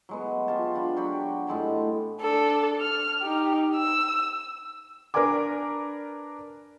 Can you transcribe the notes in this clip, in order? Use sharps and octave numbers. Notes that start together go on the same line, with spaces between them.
F#3 G#3 B3
F#3 F4 G4 A5
D4 F4 B5
F#3 F#4 G4 B5
A2 G#3 A5 B5
D4 A4
F6
D#4 G4
E6
D4 A#4 B4 D5 G#5 D6